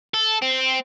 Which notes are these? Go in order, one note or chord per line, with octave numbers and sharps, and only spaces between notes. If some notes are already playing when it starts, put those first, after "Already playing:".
A4
C4